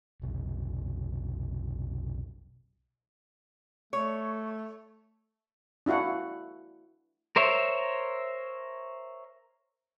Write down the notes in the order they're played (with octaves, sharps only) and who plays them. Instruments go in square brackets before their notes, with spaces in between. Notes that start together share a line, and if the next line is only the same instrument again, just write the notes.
[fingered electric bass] F1 B1
[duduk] A3 [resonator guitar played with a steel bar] C#5
[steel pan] D4 E4 F#4 F5 F#5
[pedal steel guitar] A#4 C5 C#5 E5